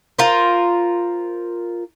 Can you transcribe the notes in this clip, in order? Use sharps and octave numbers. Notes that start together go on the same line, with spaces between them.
F4 A#4 C5